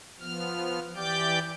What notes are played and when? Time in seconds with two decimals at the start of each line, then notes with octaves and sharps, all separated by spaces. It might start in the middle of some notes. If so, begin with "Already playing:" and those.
0.19 F3 B3 F6
0.96 E3 G4 D5 G5 D6 G6